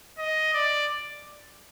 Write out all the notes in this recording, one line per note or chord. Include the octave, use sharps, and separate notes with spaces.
D#5
D5